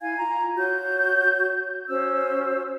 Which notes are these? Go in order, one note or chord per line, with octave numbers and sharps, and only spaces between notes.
E4 F5 G#5 G#6
F4 A#5
F#4 C#5 G6
C#4 F#4 C5 E6